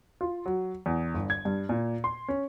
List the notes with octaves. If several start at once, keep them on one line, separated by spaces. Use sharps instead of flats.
F4
F#3
E2
G1
G#6
G2
A#2
C6
C#4